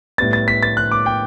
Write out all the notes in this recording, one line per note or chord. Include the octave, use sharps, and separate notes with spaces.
A2 G3 B3 A6
A6
B6
A6
F#6
D6
G5